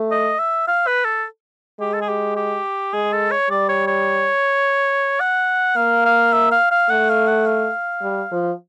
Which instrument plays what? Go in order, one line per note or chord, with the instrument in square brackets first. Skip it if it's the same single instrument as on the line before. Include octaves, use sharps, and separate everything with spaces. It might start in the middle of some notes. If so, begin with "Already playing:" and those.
Already playing: [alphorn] A3
[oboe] D#5
E5
F5
B4
A4
[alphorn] G#3 [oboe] G4
[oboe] A4
G#4
G4
G4
[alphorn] G#3 [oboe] G#4
[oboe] A4
C#5
[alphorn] G3 [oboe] D5
[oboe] C#5
C#5
F#5
[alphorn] A#3 [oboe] F5
[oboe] F5
E5
F5
F5
[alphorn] A3 [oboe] F#5
[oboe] F5
F#5
F5
[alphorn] G3
F3